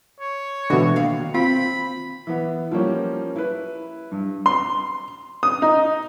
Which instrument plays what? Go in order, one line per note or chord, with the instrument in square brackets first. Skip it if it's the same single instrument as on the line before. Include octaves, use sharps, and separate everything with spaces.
[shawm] C#5
[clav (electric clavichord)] B2 D3 [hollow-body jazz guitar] E3 G#3 F#4
[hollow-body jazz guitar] D#2 F5
[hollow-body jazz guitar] C4 [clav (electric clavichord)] F4 [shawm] B5
[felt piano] E3 B3
F3 G3 A#3 C#4
E4 B4
G2
[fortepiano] C6
D#6
D#4